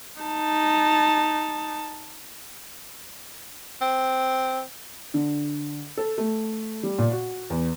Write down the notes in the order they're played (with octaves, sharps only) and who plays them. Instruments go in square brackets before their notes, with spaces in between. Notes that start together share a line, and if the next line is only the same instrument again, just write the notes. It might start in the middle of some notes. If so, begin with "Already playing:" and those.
[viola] D#4 A5
[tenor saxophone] C4
[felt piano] D3
A4
A3
G3
A#2
F#4
E2